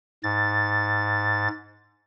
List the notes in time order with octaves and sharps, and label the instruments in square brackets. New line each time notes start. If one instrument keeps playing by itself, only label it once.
[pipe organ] G#2 A6